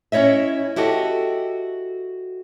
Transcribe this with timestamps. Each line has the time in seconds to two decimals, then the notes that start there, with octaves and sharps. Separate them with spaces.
0.12 C#4 E4 C#5 D#5 E5
0.76 E4 F#4 G4 A4 D#5